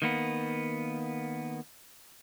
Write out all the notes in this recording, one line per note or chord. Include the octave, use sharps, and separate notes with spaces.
D#3 A#3 B3